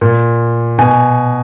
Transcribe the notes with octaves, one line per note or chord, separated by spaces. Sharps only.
A#2
B2 G#5